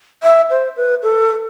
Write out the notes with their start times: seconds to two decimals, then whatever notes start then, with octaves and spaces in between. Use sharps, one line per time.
0.23 E5
0.50 C5
0.77 B4
1.03 A4